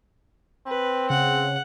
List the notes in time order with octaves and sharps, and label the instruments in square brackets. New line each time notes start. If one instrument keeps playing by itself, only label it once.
[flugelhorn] C4 [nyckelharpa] B4
[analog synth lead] C#3 [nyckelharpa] F#5